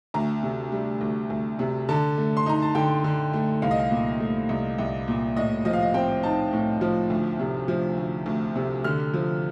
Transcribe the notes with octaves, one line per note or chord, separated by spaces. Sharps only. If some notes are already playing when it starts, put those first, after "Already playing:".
D2 A#5
C3
G3
D2
D2
C3
D3 A5
A3
C6
D#4 A#5
A5
D3 G5
D3
A3
C2 F5
D#5
F5
A#2
A3
C2
C2
A#2
A2 D#5
F3 D#5
F5
D#5
C4 G5
D#4 A5
A2
F3
D2
C3
F3
D2
D2
C3
D3 F6
F3